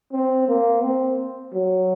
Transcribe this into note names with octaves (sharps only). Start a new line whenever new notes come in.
C4
A#3
C4
F#3